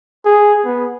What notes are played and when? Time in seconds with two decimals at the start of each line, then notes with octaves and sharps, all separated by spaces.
0.25 G#4
0.65 B3